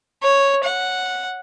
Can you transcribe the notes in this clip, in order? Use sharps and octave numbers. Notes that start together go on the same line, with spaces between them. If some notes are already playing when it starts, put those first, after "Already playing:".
C#5
F#5